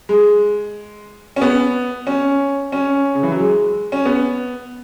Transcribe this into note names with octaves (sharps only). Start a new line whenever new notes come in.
G#3
C#4
B3
C#4
C#4
C#3
E3
F#3
G#3
C#4
B3